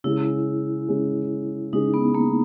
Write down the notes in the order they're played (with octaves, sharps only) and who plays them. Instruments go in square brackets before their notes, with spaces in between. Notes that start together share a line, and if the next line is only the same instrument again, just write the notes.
[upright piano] C#3 G#3 C#4 G#4 [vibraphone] E4
[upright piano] C#3 G#3 C#4 G#4
[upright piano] C#3 G#3 C#4 G#4 [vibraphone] D#4
[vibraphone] B3
A#3